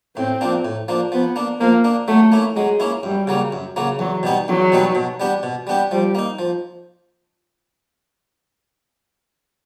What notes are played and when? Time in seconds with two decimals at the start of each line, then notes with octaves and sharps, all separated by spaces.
0.17 A2 C4
0.41 F3 A#3 D4
0.65 A2
0.88 F3 A#3 D4
1.12 F3 B3
1.36 A#3 D4
1.60 F3 A#3
1.84 A#3 D4
2.08 F#3 A3
2.32 A#3 C#4 E4
2.56 F#3 G#3
2.80 A#3 C#4 E4
3.03 F#2 G3
3.27 C#3 F#3 A#3
3.52 F#2
3.76 C#3 F#3 A#3
3.99 E2 F#3
4.23 B2 G3 B3 D#4
4.48 E2 F#3
4.72 B2 G3 B3 D#4
4.95 B2
5.20 G3 B3 D4 G4
5.43 B2
5.67 G3 B3 D4 G4
5.91 F3 G3
6.15 A#3 D#4
6.39 F3